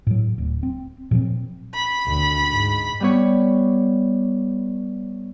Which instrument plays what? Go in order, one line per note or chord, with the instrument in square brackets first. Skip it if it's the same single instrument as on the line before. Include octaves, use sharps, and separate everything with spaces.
[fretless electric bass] A2 F#3
D1
C4
A#2 F3 F#3 C4
[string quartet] B5
[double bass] D2
G#2
[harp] G3 B3 C#5